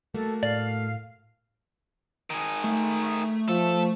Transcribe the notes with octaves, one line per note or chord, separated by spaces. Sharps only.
A3 A#3 F#4 A4
A2 D5 F5
D#3 G#4
A3
F3 A4